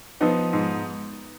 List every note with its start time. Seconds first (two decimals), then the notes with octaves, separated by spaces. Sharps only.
0.21 F3 B3 D#4
0.53 G#2